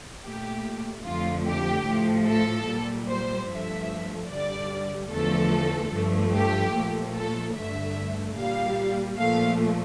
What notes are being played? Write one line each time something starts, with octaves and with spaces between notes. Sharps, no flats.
A#2 A3 G4
F2 D3 F3 A3 F4
G4
A2 F3 A3
A4
A#2 G3
C5
G2 F3 A3 E5
G2 D3 G3 D5
E2 D3 F3 A3 A4
G2 F3 A3
G4
A#2 F3 A3
A4
G2 D3 A3 E5
A#2 G3 F5
A#2 F3 A3 F5